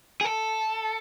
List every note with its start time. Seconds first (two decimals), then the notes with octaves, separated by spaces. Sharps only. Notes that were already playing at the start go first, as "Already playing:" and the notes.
0.21 G#4
0.25 A4